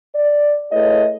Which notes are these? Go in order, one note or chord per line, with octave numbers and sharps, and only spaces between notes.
D5
A3 E4 G#4 B4 C#5 D#5